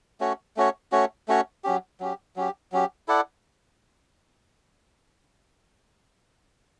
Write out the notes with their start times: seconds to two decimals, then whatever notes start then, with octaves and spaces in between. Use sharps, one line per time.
0.20 A3 C#4 F#4 C#5
0.57 A3 C#4 F#4 C#5
0.92 A3 C#4 F#4 C#5
1.28 A3 C#4 F#4 C#5
1.64 F#3 C#4 G4
2.00 F#3 C#4 G4
2.36 F#3 C#4 G4
2.72 F#3 C#4 G4
3.08 E4 A4 D5 F#5